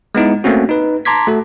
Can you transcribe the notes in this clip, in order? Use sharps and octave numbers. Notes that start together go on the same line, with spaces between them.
G#3 B3 D#4 E4
A3 A#3 C4 C#4 F#4
D#4 B4
A5 A#5 C6 D6 G#6 B6
A3 F#4 A4